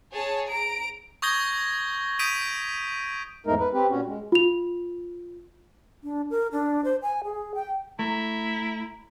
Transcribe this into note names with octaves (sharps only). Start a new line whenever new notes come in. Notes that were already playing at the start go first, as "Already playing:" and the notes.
G#4 C#5 A5
A#5 D7
C#6 D#6 G6 G#6 A#6 G7
D#6 G6 B6 D7 D#7 F7
E2 G#2 G#3 A3 D#4 A#4
B4
C4 G4 B4
A#2 C#4 F#4
G#3
F4 F7
D4
A#4
D4
C5
G#5
G#4
G5
A3 E4 A#5